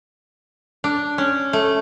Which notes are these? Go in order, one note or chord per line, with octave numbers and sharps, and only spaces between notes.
D4
C#4
A3